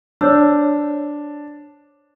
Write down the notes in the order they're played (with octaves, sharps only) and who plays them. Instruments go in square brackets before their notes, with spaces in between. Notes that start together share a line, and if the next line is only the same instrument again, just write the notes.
[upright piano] D4 [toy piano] C5 C#5 E6